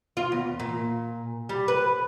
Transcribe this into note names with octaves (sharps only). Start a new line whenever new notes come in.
F4
E2
A#2
G3
B4